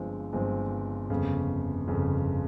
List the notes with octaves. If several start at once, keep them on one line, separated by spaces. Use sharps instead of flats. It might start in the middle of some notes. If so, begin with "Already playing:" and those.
Already playing: G1 G2 F3 G#3 C4
G1 G2 F3 G#3 C4
G1 F2 C#3
G1 F2 C#3